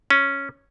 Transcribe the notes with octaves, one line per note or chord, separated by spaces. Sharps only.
C#4